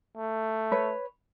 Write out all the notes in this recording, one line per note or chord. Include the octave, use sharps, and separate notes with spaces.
A3
B4 C#5